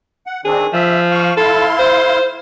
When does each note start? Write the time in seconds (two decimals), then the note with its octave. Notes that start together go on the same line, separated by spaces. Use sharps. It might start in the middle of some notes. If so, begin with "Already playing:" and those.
0.26 F#5
0.45 D#3 C4 D4 G#4
0.73 F3 E5
1.11 F5 C#6
1.37 E4 A4 F5 C6
1.79 C5